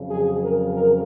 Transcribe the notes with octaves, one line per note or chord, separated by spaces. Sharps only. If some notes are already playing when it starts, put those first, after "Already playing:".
Already playing: F2 C#3 F#3
G#4
A#4
A#4